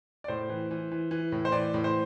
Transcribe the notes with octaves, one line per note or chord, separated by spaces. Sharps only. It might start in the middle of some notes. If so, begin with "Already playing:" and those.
D5
A2 C5
E3
E3
E3
E3
A2
C5
E3 D5
A2
C5